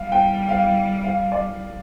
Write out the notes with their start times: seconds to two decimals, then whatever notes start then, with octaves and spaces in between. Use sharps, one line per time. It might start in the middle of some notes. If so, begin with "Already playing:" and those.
Already playing: G3 F5
0.12 G5
0.49 F5
1.04 F5
1.32 D5